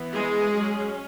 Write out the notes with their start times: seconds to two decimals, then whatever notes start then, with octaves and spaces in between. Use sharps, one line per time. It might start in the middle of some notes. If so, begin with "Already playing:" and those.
Already playing: E3 B3
0.13 G#3 G#4
0.52 F#3 C#4